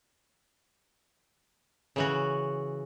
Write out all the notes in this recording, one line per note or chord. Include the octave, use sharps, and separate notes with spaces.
C#3 E3 F#4